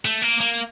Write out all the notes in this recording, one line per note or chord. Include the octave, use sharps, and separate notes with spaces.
A3
A#3
A#3